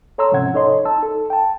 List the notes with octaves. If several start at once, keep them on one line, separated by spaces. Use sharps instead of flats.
A4 C#5 A#5 C6 E6
G#2 C3 F3 C#4 F#5 G#6
D#4 A4 C#5 D#5 C6
D#4 A5 E6
A4
G5 A5